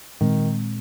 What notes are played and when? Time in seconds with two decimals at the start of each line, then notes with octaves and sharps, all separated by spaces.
0.21 A#2 D#3 G#3 C4